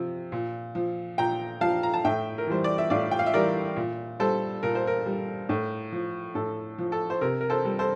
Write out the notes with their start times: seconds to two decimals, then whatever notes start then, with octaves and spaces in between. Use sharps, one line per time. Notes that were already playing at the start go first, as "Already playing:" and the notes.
Already playing: C3 F3
0.32 A#2
0.75 F3
1.18 A#2 G5 A#5
1.61 F3 F5 A5
1.83 A#5
1.94 A5
2.05 A2 E5 G5
2.38 A#4
2.47 E3 G3 C5
2.64 D5
2.78 E5
2.90 A2 D5 F5
3.11 G5
3.19 F5
3.26 E5
3.34 E3 G3 A#4 D5
3.76 A#2
4.20 G3 A4 C5
4.63 A#2 A#4
4.75 C5
4.87 A#4
5.06 G3
5.49 A2
5.92 F3
6.35 A2 A4
6.78 F3
6.92 A4
7.10 C5
7.21 C3 A#4
7.41 A#4
7.50 A4 C5
7.65 G3
7.79 A4 C5